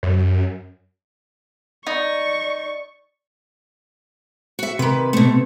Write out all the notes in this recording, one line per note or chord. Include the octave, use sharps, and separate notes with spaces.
F#2
D#4 D5 C#6
F#4 E5
C3 D#3 B4
B2 A3